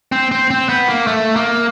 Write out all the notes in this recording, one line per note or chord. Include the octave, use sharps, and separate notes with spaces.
C4
C4
C4
B3
A#3
A3
A#3